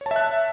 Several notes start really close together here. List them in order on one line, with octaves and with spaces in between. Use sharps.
C#5 A5 E5 F#6